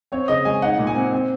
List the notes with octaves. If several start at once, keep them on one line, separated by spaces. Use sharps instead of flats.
C4 C#5
C#3 D#5
G#3 G#5
D#4 F#5
A#2
G#5
C4
C4